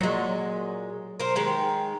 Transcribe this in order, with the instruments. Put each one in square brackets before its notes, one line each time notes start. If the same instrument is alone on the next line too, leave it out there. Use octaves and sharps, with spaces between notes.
[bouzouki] A#2 G#3 [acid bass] F#3
[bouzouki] A#4 C5
D#3 G#3 G5